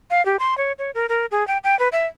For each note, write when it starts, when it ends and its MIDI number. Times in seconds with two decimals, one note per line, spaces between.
0.11 0.24 77
0.25 0.37 67
0.39 0.57 84
0.58 0.72 73
0.79 0.91 73
0.95 1.06 70
1.09 1.26 70
1.31 1.46 68
1.48 1.58 79
1.64 1.78 79
1.79 1.88 71
1.92 2.06 76